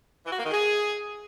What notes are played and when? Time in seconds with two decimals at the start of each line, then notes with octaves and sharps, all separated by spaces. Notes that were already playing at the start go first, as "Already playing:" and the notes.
0.25 E3
0.31 F#4
0.38 A#3
0.44 D#3
0.51 G#4